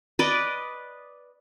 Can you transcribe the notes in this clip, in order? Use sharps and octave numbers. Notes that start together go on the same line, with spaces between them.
B4 D5 D#5